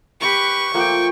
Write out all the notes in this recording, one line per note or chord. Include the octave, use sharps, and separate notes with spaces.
G4 B4 C#6
F3 A3 A#3 G5